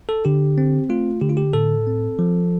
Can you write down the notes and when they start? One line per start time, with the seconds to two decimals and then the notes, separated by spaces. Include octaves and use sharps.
0.09 A4
0.25 D3 G4
0.58 C4
0.89 A3 F4
1.21 D3 G4
1.29 F4
1.37 G4
1.53 A2 A4
1.87 C4
2.19 F3